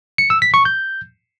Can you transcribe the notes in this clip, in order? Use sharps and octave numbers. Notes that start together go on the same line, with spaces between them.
C#7
E6
B6
C#6
G6